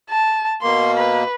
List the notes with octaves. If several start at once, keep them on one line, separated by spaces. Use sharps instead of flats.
A5
B2 A#3 C6
B4